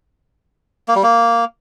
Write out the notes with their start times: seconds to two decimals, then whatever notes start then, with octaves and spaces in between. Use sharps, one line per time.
0.88 A#3
0.96 G3
1.03 A#3